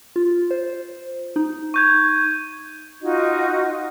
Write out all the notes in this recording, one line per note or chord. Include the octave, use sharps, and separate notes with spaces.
F4
C5
D#4
C#6 G6 G#6
D#4 F4 F#4 D#5